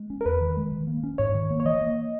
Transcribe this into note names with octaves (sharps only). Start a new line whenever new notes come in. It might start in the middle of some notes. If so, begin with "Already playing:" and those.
Already playing: G#3
C#4
A#4
E2 B4
D#3
G#3
D#3
A#3
C#4
G#2 C#5
D#3
A#3
C#5
E3 D#5
A#3